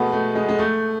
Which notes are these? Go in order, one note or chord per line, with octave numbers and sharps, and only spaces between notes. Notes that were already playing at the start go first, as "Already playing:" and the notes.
Already playing: B2 G#3 A3 B3
A3
G#3
G#3
A3